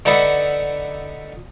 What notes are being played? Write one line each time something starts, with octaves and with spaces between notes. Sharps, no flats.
D3 D4 D#4 B4 E5 F#5